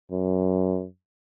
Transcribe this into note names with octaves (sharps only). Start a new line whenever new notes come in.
F#2